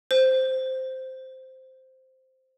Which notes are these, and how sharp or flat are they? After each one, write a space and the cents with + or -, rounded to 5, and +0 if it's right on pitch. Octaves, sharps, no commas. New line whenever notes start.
C5 -5